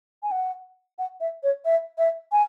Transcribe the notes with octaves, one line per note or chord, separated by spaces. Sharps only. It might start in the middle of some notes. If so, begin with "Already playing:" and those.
G#5
F#5
F#5
E5
C#5
E5
E5
G#5